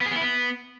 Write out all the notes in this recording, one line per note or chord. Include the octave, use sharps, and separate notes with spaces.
B3
G#4
B3
E4
B3